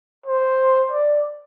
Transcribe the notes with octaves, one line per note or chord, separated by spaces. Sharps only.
C5
D5